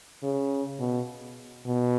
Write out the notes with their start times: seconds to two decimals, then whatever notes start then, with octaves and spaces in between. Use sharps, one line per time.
0.23 C#3
0.80 B2
1.66 B2